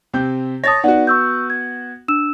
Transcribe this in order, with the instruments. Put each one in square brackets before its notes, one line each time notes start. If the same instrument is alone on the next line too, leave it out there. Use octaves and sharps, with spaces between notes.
[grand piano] C3 C4 G6
[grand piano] C#5 A5 [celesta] D#6 A6 A#6
[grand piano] B3 F#4 [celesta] D#4 D5 F#5
[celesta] C#6 E6 G6
G#6
D4 E6 E7